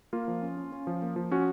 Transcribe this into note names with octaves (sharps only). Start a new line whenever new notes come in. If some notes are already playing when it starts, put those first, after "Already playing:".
A#3 F4
F3
C#4
C#4
C#4
F3
A#3
F3
C#4 F#4